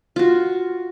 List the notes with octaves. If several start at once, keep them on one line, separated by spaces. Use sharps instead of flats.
F4 F#4